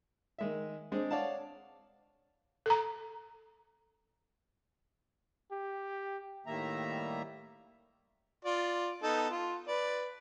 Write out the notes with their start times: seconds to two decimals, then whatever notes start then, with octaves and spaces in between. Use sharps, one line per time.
0.38 D#3 G#3 E5
0.92 G#3 C4 D4 G#4
1.10 C#5 D5 F5 F#5 A5
2.66 A4 A#5
5.51 G4
6.46 A2 D#3 G3 A#3 E5 A#5
8.45 F4 D5
9.02 B3 D#4 A4
9.30 F4
9.68 B4 D5